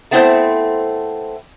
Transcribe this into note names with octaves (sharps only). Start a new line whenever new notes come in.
A3 B3 C4 E4 A4 C5